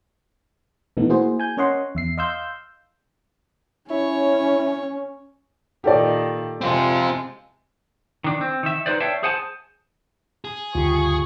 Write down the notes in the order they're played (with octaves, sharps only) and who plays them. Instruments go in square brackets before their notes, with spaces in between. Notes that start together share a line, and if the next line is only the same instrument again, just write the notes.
[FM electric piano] B2 E3 A3 B3 D#4
A#3 E4 F#4 G#4 C5
G#5 G6
C#4 A#4 C#5 D#5 F#5 C6
E2 E5 C7
D#5 F5 C6 E6 G6
[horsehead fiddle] C#4 [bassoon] E4 [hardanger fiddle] C#5
[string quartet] A#2 D#3 [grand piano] G4 A4 D5
[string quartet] C3 G#3 [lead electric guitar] C4 F4
[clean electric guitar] D#3 D4
C4
D#3 E5
D#4 F#4 B4 C5 D5
C#5 D5 E5 F5 G5 A5
G#4 C5 F#5 G#5 A5
[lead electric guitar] G#4
[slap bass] D2 G2 C#3 [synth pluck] F4 G4 [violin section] C#6